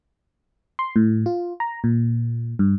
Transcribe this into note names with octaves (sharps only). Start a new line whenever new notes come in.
C6
A2
F4
A#5
A#2
G2